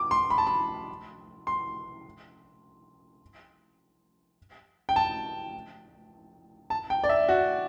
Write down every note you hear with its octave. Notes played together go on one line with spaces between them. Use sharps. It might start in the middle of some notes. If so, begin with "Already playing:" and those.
Already playing: D6
C6
B5
A5
B5
C6
G5
A5
A5
G5
D5
E5
F#4